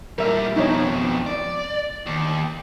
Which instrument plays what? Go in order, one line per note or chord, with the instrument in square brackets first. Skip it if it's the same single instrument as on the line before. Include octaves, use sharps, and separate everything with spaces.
[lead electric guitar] A#2 G3 [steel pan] A#4 E5
[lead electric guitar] F2 B2 [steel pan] D#4 C#5
[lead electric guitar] D5
D#2